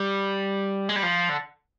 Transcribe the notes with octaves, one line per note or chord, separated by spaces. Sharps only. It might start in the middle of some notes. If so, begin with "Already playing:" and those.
Already playing: G3
G#3
G3
F3
D3